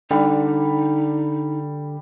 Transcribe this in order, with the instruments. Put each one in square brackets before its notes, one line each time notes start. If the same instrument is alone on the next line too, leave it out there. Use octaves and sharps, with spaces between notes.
[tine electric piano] D3 [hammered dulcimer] G3 [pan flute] D#4